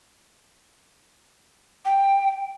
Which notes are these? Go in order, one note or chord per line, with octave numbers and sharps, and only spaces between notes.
G5